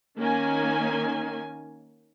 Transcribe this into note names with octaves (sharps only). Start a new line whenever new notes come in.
D#3 A#3 C#4 G#5